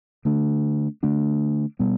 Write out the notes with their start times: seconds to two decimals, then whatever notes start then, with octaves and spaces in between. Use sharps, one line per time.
0.25 D3 A3 D4
1.03 D3 A3 D4
1.79 B2 G3 B3